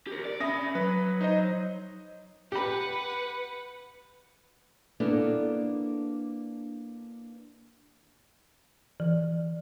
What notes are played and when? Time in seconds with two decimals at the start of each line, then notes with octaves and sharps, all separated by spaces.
0.07 G4 A#4
0.25 D5
0.40 C#4 E5 B5 D#6 A#6
0.75 F#3 B4
1.21 D#4 C5 D#5
2.52 G4 B4 F#5 B5
5.00 A#3 B3 D4 E4 A4
9.00 E3